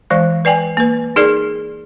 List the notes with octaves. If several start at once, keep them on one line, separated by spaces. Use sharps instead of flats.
E3 G#3 D5
B4 D5 G5 G#5
A#3 B4
D#4 G#4 A#4 D5